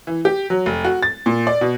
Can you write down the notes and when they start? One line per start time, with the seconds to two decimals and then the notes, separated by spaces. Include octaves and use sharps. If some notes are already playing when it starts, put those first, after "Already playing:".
0.07 E3
0.25 G4
0.50 F#3
0.66 F1
0.85 F#4
1.03 A6
1.26 A#2
1.47 D5
1.61 B2